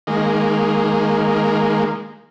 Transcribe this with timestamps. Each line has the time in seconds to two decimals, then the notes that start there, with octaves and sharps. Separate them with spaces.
0.07 D#3 G#3 A#3